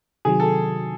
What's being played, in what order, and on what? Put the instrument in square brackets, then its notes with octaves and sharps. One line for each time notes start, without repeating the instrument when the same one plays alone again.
[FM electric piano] C3 D#3 F#3 [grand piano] G#4
[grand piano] A4